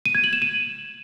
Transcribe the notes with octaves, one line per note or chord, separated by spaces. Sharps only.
D#7
G#6
F#7
E7
D#7